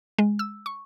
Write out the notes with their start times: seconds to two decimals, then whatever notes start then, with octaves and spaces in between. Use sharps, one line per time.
0.18 G#3
0.39 E6
0.66 C#6